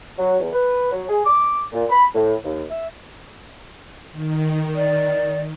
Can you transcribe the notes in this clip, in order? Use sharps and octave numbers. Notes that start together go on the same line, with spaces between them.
F#3
E2
B4
F#3
G#4
D6
A#2
B5
A2
D#2
E5
D#3
D5